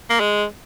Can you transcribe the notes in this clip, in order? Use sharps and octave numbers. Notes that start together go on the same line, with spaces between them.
A#3
G#3